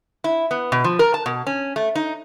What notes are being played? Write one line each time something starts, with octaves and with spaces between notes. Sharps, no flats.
E4
B3
B2
F3
A#4
A5
B2
C#4
A3
D#4